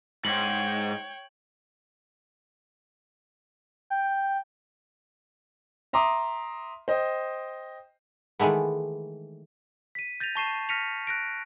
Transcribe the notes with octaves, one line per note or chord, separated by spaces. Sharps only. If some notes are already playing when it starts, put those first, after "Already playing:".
G#2 C#5 G5 F#7
G5
E5 A#5 C6 D6 D#6
C5 D#5 G5
D#3 E3 G#3 A3 B3
B6 D#7
G6 A6 A#6 D#7 F7
A5 C#6 C7 E7
F6 A#6 B6 C#7 D#7 F7
F#6 A#6 D7